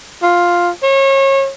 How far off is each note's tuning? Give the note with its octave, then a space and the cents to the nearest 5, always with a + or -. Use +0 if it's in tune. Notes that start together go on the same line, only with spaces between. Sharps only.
F4 +5
C#5 -30